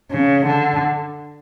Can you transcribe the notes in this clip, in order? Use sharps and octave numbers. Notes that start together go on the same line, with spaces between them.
C#3
D3